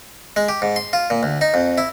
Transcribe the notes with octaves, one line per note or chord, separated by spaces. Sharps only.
G#3
G4
G#2
C6
F4
A#2
D2
D#4
F2
E4